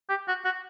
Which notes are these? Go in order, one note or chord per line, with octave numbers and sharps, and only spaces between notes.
G4
F#4
F#4